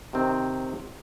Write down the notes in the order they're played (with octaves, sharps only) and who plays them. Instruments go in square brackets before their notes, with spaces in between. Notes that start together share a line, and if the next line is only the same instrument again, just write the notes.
[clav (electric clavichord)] C3 D#3 C4